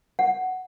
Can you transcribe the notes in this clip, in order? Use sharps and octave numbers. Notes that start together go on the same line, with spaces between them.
F#5